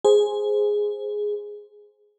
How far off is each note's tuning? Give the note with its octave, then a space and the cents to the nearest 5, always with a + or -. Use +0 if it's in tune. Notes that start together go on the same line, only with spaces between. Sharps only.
G#4 +0 C5 +0